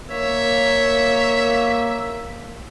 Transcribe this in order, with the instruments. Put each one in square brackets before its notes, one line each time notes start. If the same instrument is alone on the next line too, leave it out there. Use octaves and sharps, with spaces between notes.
[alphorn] A#3 [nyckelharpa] C#5 [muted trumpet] E5